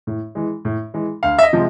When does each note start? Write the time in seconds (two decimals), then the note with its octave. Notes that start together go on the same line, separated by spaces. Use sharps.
0.07 A2
0.35 E3 G#3
0.65 A2
0.94 E3 G#3
1.23 D2 F5
1.38 E5
1.43 D#5
1.53 C3 F3 G#3